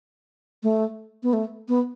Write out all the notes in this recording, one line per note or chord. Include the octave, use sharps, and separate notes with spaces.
A3
B3
A3
B3